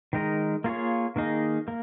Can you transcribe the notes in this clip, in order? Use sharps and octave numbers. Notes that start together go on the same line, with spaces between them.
D#3 G#3 D#4 A#4 D#5
A#3 F4 G#4 C#5
D#3 A#3 D#4 G#4 D#5
A#3